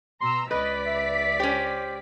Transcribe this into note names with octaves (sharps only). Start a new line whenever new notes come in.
B2 A#5 C6 E6
C#2 B4 D5 D#5 B6
E5
C#4 G4 C5